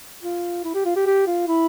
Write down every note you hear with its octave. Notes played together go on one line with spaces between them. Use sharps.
F4
E4
G4
F4
G4
G4
F4
E4